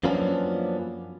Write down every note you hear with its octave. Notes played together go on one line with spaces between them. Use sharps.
F#2 F3 A#3 B3 C#4 D4